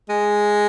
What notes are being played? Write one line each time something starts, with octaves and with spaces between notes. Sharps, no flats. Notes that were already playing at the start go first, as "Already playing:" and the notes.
G#3